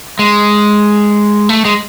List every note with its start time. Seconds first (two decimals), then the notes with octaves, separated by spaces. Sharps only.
0.19 G#3
1.49 A3
1.65 G#3